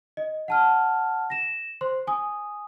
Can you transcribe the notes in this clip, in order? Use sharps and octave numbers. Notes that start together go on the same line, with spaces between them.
D#5
F#5 A5 F6
A#6 E7
C5 C6
G#5 D#6